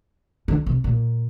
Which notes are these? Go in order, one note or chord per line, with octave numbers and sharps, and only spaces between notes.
D3
C3
A#2